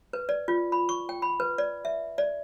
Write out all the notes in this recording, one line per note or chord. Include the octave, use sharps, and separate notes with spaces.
B4
D5
F4
B5
C#6
G5
B5
B4
D5
E5
D5